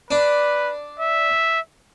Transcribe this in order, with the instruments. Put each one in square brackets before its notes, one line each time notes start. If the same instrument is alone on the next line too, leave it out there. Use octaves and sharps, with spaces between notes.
[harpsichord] D4 [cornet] B4
[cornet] E5